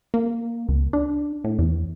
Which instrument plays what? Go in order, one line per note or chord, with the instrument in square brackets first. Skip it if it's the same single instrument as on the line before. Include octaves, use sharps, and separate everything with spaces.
[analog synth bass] A#3
C#2
D4
A2
E2